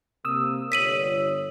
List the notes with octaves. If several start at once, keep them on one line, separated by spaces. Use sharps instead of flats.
C3 A#3 D#6 E6
G1 C#5 B6 D#7 F#7